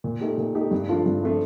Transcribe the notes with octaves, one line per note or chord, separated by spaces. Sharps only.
A#2
A3 D#4 G4
A#2
A3 D#4 G4
G2
F3 A3 D4 F4
G2
F3 A3 D4 F4